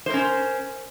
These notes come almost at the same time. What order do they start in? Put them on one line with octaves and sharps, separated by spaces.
C5 A#4 C#4